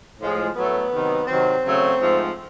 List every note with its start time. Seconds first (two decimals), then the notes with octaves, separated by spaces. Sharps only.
0.20 A2 F3 G#3
0.55 A2 F#3 A3 B3
0.92 C3 D#3 F#3
1.27 C3 D#3 F#3 C4
1.64 C#3 F#3 A3
2.00 G#2 F3 A3